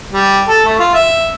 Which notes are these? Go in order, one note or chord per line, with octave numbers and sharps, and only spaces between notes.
G3
A4
A3
F4
E5